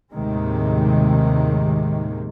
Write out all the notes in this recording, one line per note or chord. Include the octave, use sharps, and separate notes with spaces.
D#2 A2 C3 D#3 G#3